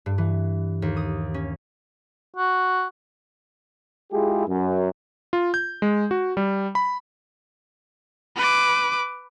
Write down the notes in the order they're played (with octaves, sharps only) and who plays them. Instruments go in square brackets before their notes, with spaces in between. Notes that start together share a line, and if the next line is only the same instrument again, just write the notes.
[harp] G2
E3
D#2
D#6
C#4
[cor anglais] F#4
[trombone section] G#3 E4 F4 G4 G#4
F#2
[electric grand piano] F4
G6
G#3
F#4
G3
B5
[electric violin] B4 D6